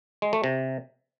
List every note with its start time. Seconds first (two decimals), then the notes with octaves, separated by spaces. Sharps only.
0.22 G#3
0.33 A3
0.44 C3